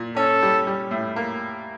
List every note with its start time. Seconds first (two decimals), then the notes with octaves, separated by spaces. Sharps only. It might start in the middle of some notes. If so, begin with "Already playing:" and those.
Already playing: A#2
0.16 C#4 A4
0.42 G3
0.67 G3
0.91 A2
1.16 A#3